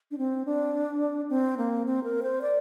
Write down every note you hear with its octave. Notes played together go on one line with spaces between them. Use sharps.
D4
C4
D4
C4
A#3
C4
A#4
C5
D5